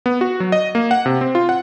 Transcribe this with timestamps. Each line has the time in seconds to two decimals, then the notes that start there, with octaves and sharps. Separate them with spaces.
0.06 B3
0.21 F#4
0.40 F#3
0.52 D#5
0.75 A#3
0.91 F#5
1.06 C3
1.21 C4
1.35 F4
1.49 F#5